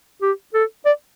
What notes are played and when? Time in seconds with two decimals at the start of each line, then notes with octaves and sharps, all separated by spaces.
0.22 G4
0.54 A4
0.86 D5